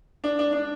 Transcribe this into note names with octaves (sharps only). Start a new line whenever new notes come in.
D4
D4
D4